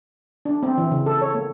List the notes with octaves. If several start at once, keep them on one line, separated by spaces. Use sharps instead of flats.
D4
C4
E3
C#3
A4
C#5
A#3